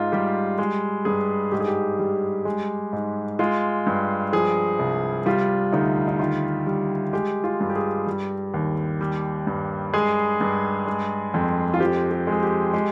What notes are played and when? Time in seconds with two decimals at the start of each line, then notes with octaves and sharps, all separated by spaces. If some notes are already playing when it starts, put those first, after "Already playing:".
Already playing: G#2 F4
0.12 G3 G4
0.58 G#3
1.05 G2 G#4
1.52 G#2 G4
1.60 G#4
1.68 G4
1.99 G3
2.45 G#3
2.93 G#2
3.39 G#3 F4
3.87 G2
4.33 F3 G#4
4.79 C2
5.26 G3 F4
5.73 D2 D#4
6.08 D#4
6.19 D#3 F4
6.67 G3
7.13 G#3 G4
7.44 F4
7.61 G2
7.70 G4
7.76 G#4
8.06 G3
8.54 D#2
9.01 G3
9.47 G2
9.93 G#3 G#4
10.41 G2
10.87 G#3
11.34 F2
11.74 F4
11.80 F3 G4
12.11 G4
12.27 G#3
12.32 G#4
12.43 G4
12.73 G#3 G4